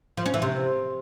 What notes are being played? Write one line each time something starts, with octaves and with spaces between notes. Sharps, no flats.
F3
C#4
E3
C3